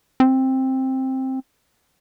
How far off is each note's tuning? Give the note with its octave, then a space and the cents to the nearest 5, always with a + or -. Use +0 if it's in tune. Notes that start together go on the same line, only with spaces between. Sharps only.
C4 +10